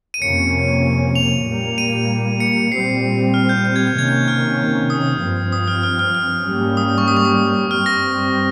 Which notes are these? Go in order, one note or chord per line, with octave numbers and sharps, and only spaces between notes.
D#7
F2 C3 F3 A#3 C#4 C#7
F7
A#2 G3 A#3
D#7
C#7
A#2 G3 C4 C7
F6
G6
G6
G#6
G6
C3 D#3 A#3 C#4 G#6
G6
F6
D#6
G2 F3 C4
D#6
F6
F6
F6
F6
G#2 G3 A#3 C#4
D#6
C#6
D#6
C#6
D#6
G2 G3 C4 F6
A#6